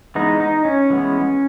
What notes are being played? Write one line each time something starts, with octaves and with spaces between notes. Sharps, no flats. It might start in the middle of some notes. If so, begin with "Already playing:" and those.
E3 G#3 B3 D#4
D#4
C#4
E3 G#3 B3